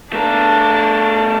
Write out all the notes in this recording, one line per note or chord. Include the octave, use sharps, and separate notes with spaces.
A3 D4 A#4 A5